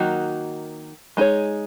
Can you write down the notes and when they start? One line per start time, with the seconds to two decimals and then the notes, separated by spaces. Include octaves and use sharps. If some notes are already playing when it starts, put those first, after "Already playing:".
Already playing: D#3 F#3 A#3 D#4 F#4
1.17 G#3 D#4 G#4 C#5